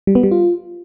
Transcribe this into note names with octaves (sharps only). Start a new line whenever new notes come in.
G3
B3
G3
F4